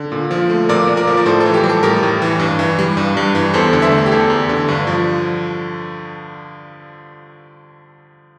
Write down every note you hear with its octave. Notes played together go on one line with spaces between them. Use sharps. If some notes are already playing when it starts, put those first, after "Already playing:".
Already playing: D3
A#2
F3
A3
A#2 A#4 D5
A#2
A#4 D5
F3
D5
A2 A4 C5
A4
E3
G4
G3
A4
A2 G4 A#4
A2
E3
G2
E3
G3
G2
G2
E3
E2 A4 C5
D3
C5 E5
A3
G4
E2 A4
E2
D3
G2
F3